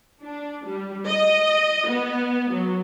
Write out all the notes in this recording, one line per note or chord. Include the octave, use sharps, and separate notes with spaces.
D4
G3
D#5
B3
F#3